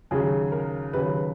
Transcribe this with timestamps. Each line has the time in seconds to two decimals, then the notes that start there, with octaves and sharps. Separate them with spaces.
0.11 D#2 C#3 F#3 G#4
0.52 A#4
0.93 D#2 C#3 F#3 B4